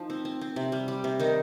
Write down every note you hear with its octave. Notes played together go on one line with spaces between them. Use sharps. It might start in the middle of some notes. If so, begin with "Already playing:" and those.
Already playing: F3 D#4
C4
C4
C4
C3
G3
G3
C3
D#3 D#4